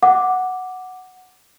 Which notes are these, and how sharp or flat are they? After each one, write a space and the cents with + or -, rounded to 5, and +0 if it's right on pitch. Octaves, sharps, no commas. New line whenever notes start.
F#5 +0 D6 +0